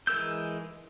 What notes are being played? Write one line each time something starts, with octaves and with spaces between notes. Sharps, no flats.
E3 G#3 A#4 E6 G6